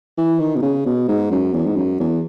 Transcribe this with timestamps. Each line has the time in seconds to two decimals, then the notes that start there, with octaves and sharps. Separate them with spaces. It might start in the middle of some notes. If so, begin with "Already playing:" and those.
0.18 E3
0.39 D#3
0.56 B2
0.62 C#3
0.85 B2
1.08 G#2
1.31 F#2
1.53 E2
1.66 G#2
1.76 F#2
2.00 E2